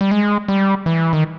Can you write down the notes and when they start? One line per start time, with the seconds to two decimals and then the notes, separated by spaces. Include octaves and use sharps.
0.01 G3
0.11 G#3
0.48 G3
0.86 E3
1.13 D#3